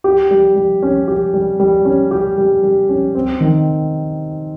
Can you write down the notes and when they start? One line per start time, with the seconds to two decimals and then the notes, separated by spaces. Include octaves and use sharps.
0.04 G4
0.31 G3
0.56 G3
0.82 C#4
1.08 G4
1.34 G3
1.60 G3
1.85 C#4
2.11 G4
2.38 G3
2.63 G3
2.89 C#4
3.15 C4
3.41 D#3